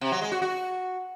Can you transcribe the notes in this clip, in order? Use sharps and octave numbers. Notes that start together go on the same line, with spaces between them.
C3
F#3
G#3
F#4
F#4